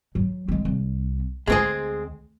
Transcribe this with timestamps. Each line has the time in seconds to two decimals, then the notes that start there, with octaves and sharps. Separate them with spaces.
0.15 F#3
0.48 G#3 C4
0.65 C2
1.47 D2 G#3 C4 G#4